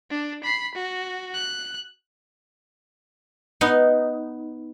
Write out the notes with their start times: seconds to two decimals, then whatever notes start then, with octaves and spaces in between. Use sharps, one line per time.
0.10 D4
0.44 B5 C7
0.75 F#4
1.34 F#6
3.61 B3 D#4